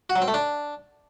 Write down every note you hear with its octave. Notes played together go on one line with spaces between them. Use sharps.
F#4
F#3
C4
A3
D4